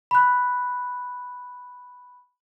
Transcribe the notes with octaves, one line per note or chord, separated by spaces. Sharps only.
B5 F#6